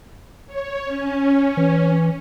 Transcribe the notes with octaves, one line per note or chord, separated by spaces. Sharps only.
C#5
C#4
E3